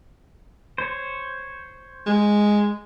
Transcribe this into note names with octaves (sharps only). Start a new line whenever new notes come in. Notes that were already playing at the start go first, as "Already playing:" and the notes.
C5 C#5
G#3